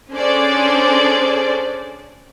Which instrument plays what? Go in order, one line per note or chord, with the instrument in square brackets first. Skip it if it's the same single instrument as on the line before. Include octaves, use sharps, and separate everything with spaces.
[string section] C#4 D4 G#4 A4 C5 D5